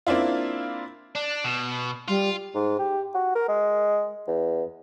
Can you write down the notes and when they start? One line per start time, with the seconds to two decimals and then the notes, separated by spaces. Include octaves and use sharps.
0.07 A#3 C4 D4 E4 F4
1.15 D4
1.44 B2
2.08 G3 F4
2.55 G#2
2.79 G4
3.15 F#4
3.35 A#4
3.49 G#3
4.28 E2